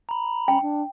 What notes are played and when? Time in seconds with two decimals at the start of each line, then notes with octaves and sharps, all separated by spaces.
0.09 A#5 B5
0.48 C#4 G5
0.62 D4